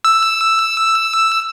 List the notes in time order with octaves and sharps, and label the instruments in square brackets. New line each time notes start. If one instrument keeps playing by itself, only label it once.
[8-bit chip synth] E6